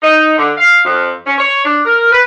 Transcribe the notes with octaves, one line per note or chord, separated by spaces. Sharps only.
D#4
D3
F5
F2
C#4
C#5
D4
A#4
B4